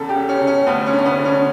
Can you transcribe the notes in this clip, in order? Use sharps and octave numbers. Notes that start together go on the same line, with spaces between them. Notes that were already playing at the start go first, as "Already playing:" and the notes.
Already playing: E2 C#3 A4
G4
C#3
C#4
C#3
C#4
D2 B3
C#4
D3
C#4
B3
D3
C#4